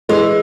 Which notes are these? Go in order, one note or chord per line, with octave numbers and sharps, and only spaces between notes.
E3 G#3